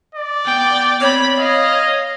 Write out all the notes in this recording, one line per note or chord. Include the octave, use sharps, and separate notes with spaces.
D5
B3 G5
C4 C#5 B5
D#5 F5